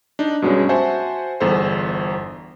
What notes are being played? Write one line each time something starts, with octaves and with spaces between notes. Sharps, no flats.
D4 D#4
G2 B2 F#3 G#3 C#4
F#4 C5 E5 F#5 G#5 A5
G1 E2 A4 C5